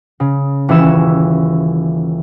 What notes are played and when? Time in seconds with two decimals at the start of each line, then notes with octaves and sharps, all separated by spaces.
0.20 C#3
0.68 D#1 E3 C#4 C#6 E6 E7